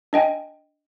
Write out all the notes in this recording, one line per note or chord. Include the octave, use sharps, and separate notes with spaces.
D4 D#5 G5 G#5